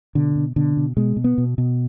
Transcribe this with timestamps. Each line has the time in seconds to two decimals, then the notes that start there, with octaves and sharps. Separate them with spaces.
0.15 B2 D3
0.36 B2
0.56 B2 D3
0.77 B2
0.97 B2 G#3
1.17 B2
1.24 B3
1.38 B2
1.58 B2